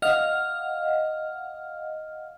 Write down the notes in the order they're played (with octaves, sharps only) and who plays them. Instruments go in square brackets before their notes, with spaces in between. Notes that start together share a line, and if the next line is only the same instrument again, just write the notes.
[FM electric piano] D#5 F5 F#5 F6